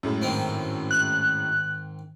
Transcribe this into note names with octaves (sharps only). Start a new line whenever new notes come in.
F#2 A2 G#3
G#2 D#3 C4
F#6